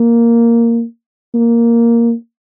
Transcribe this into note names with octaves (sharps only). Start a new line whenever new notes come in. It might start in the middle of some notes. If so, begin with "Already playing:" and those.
Already playing: A#3
A#3